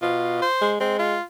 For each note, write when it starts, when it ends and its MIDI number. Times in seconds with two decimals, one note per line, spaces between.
0.02 0.41 47
0.02 0.46 65
0.42 0.72 72
0.61 0.76 56
0.80 1.16 56
0.80 0.94 60
0.99 1.22 65